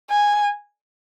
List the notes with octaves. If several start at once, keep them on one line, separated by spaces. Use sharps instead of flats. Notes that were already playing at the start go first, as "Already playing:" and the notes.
G#5